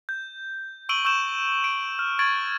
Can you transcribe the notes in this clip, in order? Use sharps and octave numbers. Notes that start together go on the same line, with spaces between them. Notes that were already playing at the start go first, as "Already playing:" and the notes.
G6
C#6 E6 D7 D#7 F#7 G7
C#6 E6 G6 E7
D7
F6
C#6 G#6 A6 D7 F#7